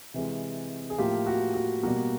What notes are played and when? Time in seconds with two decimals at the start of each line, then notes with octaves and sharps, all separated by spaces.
0.14 C3 E3 G#3
0.90 G#4
0.98 A2 F3 A#3 F4 G4
1.27 F#4
1.54 F#4
1.83 B2 G3 A#3 F#4